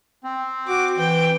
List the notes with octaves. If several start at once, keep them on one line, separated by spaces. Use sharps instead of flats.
C4
F#4 D6
E3 G5